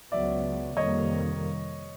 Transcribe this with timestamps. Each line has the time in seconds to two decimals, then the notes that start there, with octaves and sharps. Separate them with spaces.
0.12 C#2 C#3 F#3 B3 D5 E5
0.77 F2 C3 D#3 G3 A#3 C#5 D#5